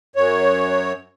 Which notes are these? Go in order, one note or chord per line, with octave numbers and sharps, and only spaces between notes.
F#2 C#5